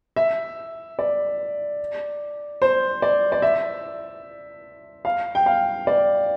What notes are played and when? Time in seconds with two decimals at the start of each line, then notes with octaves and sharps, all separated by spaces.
0.16 E5
0.99 D5
2.62 C5
3.02 D5
3.32 D5
3.42 E5
5.05 F5
5.35 G5
5.46 F5
5.87 D5